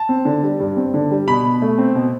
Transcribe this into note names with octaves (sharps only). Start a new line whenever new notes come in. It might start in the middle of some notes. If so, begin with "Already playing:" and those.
Already playing: A5
C4
D3
G3
G2
C4
D3
G3
B2 B5
B2
A3
C4
B2